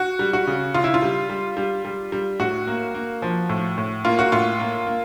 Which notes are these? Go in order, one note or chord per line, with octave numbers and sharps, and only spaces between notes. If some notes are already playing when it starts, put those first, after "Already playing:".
Already playing: F#4
G3
F#4
C#3
C#3 F4
E4
F4
G3
G3
G3
G3
G3
A2 F#4
A#3
A#3
F3
A2
A2
A#3 F4
F#4
A2 F4
A#3
A#3